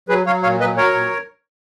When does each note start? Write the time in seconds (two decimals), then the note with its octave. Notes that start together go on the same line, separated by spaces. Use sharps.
0.09 F#3 G#4 B4
0.26 F#3 C#5 F5
0.43 A#2 C#5 F5
0.60 F#3 B4 D#5
0.77 F#3 A#4 C#5
0.94 A#2